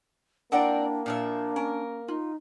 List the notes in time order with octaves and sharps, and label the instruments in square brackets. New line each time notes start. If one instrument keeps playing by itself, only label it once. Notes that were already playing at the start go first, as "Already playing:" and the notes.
[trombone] A#3 [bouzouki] C4 A#4 D5 [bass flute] D4 [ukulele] E4 F#5 G5
[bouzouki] A#2 F3 E5 [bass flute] D4
[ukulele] C#4 [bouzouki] A#4
[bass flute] D#4 [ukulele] F4